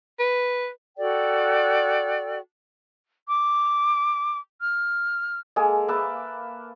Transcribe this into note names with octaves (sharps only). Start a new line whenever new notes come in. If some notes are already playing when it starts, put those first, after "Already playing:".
B4
F#4 A4 D5 G5
D6
F6
G#3 A#3 G#4 A4
A#3 B4 E5 A5